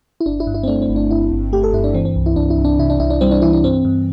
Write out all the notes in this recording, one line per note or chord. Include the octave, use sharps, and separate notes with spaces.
E4
G1 D4
E4
G2
E4
C4
A3 D4
C4
G1
D4
G1 E4
G1
A3 G4
A4
G2 E4
D4
E3 C4
C4
C2
E4
C2 D4
E4
C2
D4
C3 E4
D4
C2 E4
D4
G3 C4
D4
E3 E4
D4
G2 C4
G2